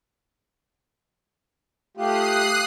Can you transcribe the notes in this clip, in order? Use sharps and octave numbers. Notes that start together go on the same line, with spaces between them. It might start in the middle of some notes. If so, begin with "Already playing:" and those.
A3 F4 G4 D#6 F#6 C7